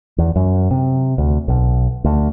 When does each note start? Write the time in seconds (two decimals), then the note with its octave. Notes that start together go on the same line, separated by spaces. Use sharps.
0.18 E2
0.36 F#2
0.71 C3
1.18 D2
1.48 B1
2.04 D2